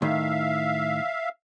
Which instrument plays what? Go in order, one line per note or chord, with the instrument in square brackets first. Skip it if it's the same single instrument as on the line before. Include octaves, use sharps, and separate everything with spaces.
[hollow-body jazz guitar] A2 D#3 [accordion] E5 F5